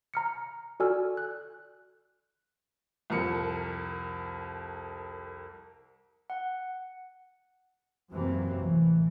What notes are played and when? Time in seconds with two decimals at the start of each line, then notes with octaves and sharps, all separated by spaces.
0.14 A#5 F6 C#7
0.80 F#4 A4 D5 G#5 E6 F6
1.17 F#6
3.10 C2 F2 A#4 C#7
6.30 F#5
8.10 F#2 C3 E3 F#3 A#3 C4
8.57 A1 E3